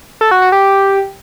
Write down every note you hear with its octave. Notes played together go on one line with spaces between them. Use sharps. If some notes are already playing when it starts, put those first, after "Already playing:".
A4
F#4
F#4
G4